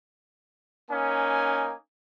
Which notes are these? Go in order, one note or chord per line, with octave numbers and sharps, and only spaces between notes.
A#3 C#4 D#4 G#5